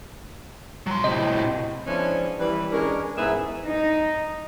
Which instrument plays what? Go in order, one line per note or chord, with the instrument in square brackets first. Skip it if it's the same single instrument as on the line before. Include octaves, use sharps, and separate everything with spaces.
[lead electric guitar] F#3 C6
[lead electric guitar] A2 C3 [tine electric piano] D#5
[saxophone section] F3 G#3 B3 C#4 D4 E4
E3 G3 B4
G#3 C#4 D4 A#4
G#2 E3 B3 G#4 E5
[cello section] D#4